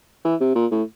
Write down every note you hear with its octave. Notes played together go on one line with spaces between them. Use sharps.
E3
C3
A#2
A2